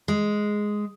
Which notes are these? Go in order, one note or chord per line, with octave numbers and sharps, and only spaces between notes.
G#3